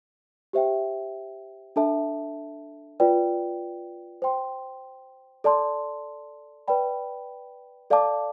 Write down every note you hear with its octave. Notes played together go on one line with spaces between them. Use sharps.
G4 C5 E5 G5
D4 A4 E5 A5
F4 B4 D5 G5
C5 G5 C6
A4 D5 A5 C6
B4 D5 G5 B5
A4 D5 F5 A5 D6